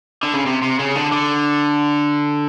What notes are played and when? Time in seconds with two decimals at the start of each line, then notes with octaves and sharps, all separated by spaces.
0.23 D3
0.34 C#3
0.46 C3
0.62 C3
0.79 C#3
0.95 D3
1.12 D3